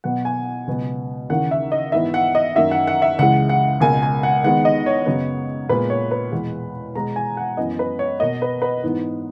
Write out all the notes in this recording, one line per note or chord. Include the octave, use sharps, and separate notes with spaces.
B2 F#3 B3 F#5
G#5
C#2 B2 F#3 B3
D#2 C#3 E3 A#3 F#5
E5
D#5
G#2 E3 B3 E5
F#5
D#5
F#2 D#3 A#3 E5
F#5
F#5
E5
C#2 C#3 E3 G#3 F#5
F#5
C#2 B2 A#3 G#5
G#5
F#5
D#2 D#3 G#3 B3 F#5
D#5
C#5
F#2 C#3 F#3 B3
A#2 G#3 B3 B4
C#5
B4
E2 B2 G#3 B3
B2 G#3 B3 A#5
G#5
F#5
F#2 E3 B3 D#5
B4
C#5
B2 A#3 D#5
B4
B4
G#2 E3 B3